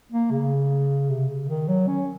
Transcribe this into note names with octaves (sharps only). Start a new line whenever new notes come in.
A#3
C#3
C3
C#3
D#3
F#3
C#4